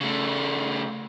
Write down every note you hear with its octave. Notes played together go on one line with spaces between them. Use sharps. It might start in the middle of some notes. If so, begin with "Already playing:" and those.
C#3 A3